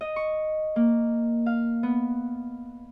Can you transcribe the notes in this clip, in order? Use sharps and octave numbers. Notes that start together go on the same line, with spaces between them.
D#5
C#6
A#3
F5
B3